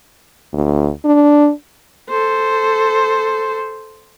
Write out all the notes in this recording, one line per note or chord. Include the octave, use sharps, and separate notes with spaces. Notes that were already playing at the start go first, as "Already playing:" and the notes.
D2
D4
A4 C5